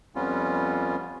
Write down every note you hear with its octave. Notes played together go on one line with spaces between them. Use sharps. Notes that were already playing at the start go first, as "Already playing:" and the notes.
F2 G3 B3 C#4 F4